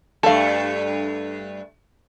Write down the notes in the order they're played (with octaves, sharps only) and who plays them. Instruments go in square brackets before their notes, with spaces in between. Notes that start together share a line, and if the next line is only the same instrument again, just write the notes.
[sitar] G2 A3 [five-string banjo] A4 F5